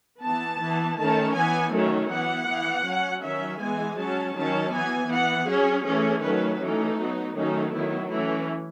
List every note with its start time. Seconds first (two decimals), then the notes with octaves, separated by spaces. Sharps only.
0.22 E3 B3 A5
0.59 E3 B3
0.97 D#3 A3 C#4 A5
1.34 E3 B3 G#5
1.71 D#3 F#3 A3 C#4
2.10 E3 B3 F#5
2.47 E3 B3
2.85 F#3 C#4
3.22 D#3 F#3 C#4 E5
3.59 E3 G#3 B3 G#5
3.97 F#3 C#4 A5
4.35 D#3 F#3 C#4 A5
4.72 E3 B3 G#5
5.10 E3 B3 F#5
5.47 F#3 C#4 G#4
5.84 E3 A3 C#4 G#4
6.22 D#3 F#3 A3 C#4 B4
6.60 E3 A3 C#4 D#4
6.97 F#3 B3
7.34 D#3 F#3 A3 C#4 D#4
7.72 D#3 F#3 B3 E4
8.09 E3 A3 C#4 E4